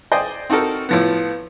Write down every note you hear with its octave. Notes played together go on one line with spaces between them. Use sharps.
C5 D5 D#5 G5 G#5
C4 D#4 F#4 A4 A#4
A2 F3 B3